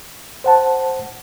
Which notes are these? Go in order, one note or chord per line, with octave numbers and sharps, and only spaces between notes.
C5 F#5 A5